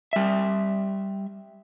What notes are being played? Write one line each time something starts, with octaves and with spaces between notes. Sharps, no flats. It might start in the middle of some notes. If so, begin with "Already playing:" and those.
G3 E5